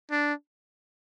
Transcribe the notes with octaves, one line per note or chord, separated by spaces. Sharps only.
D4